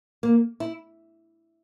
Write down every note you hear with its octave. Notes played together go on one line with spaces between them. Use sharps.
A#3
E4